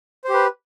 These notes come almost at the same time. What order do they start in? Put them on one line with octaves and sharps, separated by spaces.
C5 G4 B4